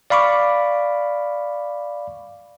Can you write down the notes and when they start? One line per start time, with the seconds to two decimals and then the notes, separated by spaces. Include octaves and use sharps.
0.10 D5 F5 B5 C#6 D6